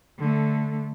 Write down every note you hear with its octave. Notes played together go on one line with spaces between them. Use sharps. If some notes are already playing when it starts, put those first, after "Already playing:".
D3 A3